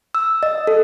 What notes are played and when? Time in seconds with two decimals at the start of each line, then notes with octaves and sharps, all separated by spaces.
0.15 E6
0.43 D#5
0.67 A4